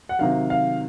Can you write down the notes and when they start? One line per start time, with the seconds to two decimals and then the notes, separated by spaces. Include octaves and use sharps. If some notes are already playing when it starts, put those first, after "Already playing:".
0.09 F#5
0.19 C3 D#3 F#3 F5
0.50 F5